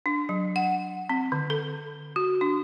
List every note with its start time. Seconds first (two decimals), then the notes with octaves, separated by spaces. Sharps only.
0.06 D4
0.29 F#3
0.56 F#5
1.09 C4
1.32 D3
1.50 A4
2.16 F#4
2.41 D4